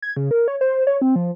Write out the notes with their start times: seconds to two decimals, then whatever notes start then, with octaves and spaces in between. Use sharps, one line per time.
0.02 G#6
0.17 C#3
0.31 A#4
0.48 C#5
0.61 C5
0.87 C#5
1.01 C4
1.16 F3